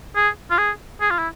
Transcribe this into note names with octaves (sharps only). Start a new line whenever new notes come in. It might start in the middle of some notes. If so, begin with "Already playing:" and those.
G#4
F4
G#4
G#4
F4
E4